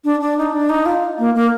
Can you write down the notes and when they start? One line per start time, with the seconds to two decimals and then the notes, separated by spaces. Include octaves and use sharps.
0.05 D4
0.20 D4
0.38 D#4
0.53 D4
0.70 D#4
0.86 F4
1.19 A#3
1.35 A#3